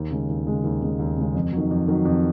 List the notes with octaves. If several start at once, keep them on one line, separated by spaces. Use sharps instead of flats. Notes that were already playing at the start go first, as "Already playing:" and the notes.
Already playing: D#2
C#3 G#3
D#2
C#3 G#3
D#2
C#3 G#3
D#2
C#3 G#3
F2
D#3 F#3
F2
D#3 F#3
F2